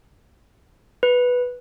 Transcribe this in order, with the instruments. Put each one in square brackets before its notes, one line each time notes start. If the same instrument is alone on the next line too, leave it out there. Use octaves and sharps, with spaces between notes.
[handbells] B4